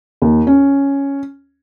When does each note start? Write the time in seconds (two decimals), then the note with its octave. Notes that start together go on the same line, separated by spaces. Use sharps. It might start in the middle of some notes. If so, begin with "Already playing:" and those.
0.22 D#2
0.47 C#4